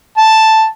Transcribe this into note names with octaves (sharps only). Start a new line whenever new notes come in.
A5